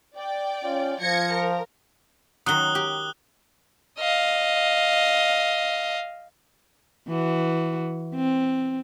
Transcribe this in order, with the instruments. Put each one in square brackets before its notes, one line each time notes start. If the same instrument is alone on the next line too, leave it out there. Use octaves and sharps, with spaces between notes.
[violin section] D5 G5
[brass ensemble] C#4 F4
[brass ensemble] F3 [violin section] G#6 A#6 C#7
[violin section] A#4
[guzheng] D#3 F#3 [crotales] D#6 F#6 G7
[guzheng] G4
[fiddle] D#5 F5
[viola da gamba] E3 F#4
C4